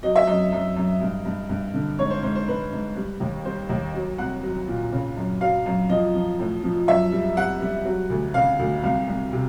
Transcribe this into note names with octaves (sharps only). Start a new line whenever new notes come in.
F#3 D#5
E5
F#2 D#5
F#2
F#2
G2
G2
G2
D3
G#2 C#5
C5
G#2 C5
C5
G#2 B4
G#2
G3
D#2
G3 C5
D#2
F#3
C2 F#5
F#3
A#2
C#3
F#2
F#3 F5
F#2
F3 D#5
F3
A2
F3
F#2 E5
G3
G3 F#5
G3
F#3
D2
C#3 F5
D2
C2 F5
C2
C3